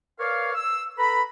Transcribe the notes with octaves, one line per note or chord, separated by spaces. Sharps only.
A#4 B4 C#5 D5 F5
E6
A4 B4 A#5 B5